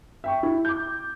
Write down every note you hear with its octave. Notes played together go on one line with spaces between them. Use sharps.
E5 G5 C#6
E4
D6 G6